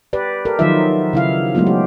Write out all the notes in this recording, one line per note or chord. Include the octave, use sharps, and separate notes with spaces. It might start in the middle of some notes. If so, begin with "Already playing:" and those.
G4 B4 D5
G4 A4 A#4
D#3 F3 F#3 D#4 F4 E5
C#3 E4 F5
F#3 G#3 A3 B3 F4
G4